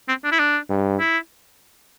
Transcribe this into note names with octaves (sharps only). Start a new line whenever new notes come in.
C4
D4
E4
D4
G2
E4